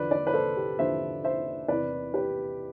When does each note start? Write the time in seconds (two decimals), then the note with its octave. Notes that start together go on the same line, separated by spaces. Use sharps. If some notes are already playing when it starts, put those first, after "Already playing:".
Already playing: E2 D3 F3 B4 D5
0.11 B4 D5
0.27 B4
0.34 A4 C5
0.57 G4
0.79 E2 D3 F3 C5 E5
1.24 C5 E5
1.68 E2 C3 E3 B4 D5
2.14 G4 B4